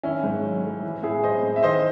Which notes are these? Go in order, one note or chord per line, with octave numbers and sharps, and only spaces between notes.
D#3 C#4 E4
G#2
F#3
A3
E3
A2 E4 G#4
G#3 C5 D#5
A2
E5
D#3 C5 D#5